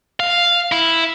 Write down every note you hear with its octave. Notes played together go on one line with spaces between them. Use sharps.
F5
E4